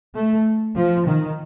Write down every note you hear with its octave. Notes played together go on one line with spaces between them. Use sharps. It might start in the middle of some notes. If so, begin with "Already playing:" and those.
A3
F3
D#3